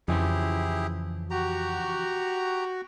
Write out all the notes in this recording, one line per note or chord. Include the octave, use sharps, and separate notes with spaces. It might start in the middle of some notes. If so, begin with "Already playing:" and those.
F2 C#3 E3 F3 E4 G4 G#4
F#4 G4 A#5